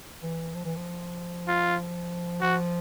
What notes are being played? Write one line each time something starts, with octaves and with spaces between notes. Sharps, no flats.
E3
F3
E3
F3
F4
F3 F#4